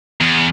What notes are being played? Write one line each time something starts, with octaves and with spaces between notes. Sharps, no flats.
E2